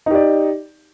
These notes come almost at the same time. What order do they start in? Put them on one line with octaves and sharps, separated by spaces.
D#4 G4 D5